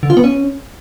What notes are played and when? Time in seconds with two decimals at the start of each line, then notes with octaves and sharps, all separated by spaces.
0.03 D3
0.10 F4
0.17 B3
0.24 C#4